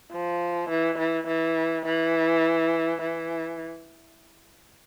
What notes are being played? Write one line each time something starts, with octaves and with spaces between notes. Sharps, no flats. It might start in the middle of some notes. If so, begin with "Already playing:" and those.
F3
E3
E3
E3
E3
E3